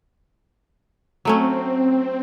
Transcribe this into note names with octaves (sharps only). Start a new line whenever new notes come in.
F#3 A3 C4 C#4